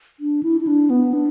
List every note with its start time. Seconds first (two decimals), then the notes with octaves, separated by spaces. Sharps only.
0.20 D4
0.43 E4
0.61 E4
0.67 D4
0.90 B3
1.13 D4